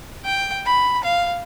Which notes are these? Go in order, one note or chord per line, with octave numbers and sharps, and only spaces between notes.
G5
B5
F5